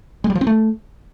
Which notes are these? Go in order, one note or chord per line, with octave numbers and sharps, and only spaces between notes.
G#3
G3
F3
C4
A3